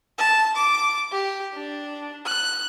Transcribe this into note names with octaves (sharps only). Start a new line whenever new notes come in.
A5
D6
G4
D4
F#6